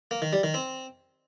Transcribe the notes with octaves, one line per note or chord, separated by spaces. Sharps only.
A#3
D#3
G3
D#3
C4